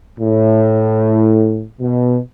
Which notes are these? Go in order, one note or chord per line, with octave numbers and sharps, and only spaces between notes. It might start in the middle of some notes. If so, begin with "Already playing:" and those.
A2
B2